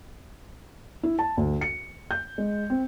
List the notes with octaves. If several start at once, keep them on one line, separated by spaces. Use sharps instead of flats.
E4
A5
D2
C#7
G6
G#3
C4